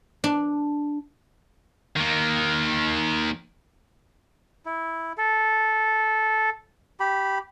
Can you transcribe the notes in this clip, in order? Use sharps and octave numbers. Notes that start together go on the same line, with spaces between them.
D4
D#3 A#3
E4
A4
G4 B5